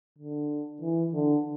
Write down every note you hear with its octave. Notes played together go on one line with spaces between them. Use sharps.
D3
E3
D3